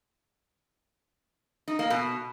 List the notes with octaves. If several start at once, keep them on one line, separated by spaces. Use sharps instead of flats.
D#4
A#3
B2